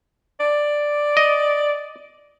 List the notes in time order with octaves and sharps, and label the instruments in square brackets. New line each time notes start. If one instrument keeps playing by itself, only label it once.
[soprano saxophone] D5
[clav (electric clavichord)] D#5